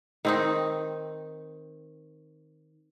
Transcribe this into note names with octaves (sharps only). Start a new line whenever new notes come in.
D#3 C4 D#4